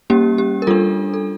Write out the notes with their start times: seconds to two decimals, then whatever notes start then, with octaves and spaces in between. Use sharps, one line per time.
0.10 G3 A#3 C#4 G4
0.38 G4
0.62 A#4
0.67 G3 D4 F4 A4
1.14 A4